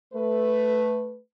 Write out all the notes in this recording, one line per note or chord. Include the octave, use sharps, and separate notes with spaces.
A3 B4